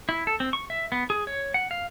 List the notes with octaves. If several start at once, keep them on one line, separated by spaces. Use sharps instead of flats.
E4
A4
C4
C#6
E5
B3
G#4
C#5
F#5
F5